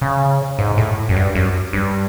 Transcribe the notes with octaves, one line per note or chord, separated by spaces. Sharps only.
C#3
G#2
A2
F#2
G2
F#2
G2